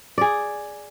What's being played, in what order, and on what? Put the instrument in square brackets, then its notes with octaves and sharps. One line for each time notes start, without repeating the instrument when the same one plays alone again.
[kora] G#4 D5